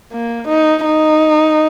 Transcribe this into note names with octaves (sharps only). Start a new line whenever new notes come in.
A#3
D#4
D#4